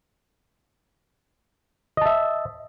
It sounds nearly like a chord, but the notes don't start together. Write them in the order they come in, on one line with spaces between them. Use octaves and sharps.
D#5 A5 E5